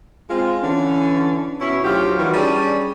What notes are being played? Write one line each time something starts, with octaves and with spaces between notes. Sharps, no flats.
G#3 C4 F4
D3 E3 C#4
B2 C#4 E4
D2 F#3 F4 G4
D#3 E3 G3 E4 F#4
G3 C#4 D4 G#4